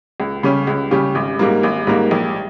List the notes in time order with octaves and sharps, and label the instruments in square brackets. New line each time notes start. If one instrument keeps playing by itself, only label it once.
[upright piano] C#2
C#3 G3 C#4 G4
C#2
C#3 G3 C#4 G4
G#1
G#2 G3 A#3
G#1
G#2 G3 A#3
A#1